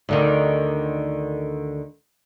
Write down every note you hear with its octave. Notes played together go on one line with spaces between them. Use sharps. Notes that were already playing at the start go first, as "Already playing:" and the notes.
D2 D3 D#3